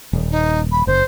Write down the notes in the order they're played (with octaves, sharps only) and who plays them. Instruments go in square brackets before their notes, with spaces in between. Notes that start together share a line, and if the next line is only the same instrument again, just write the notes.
[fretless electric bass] D#1
[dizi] D#4
B5
[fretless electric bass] F#1 [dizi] C5